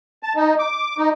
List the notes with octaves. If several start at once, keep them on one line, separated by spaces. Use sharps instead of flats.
A5
D#4
D6
D#4